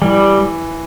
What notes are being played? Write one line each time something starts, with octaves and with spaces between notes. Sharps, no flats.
E3 G3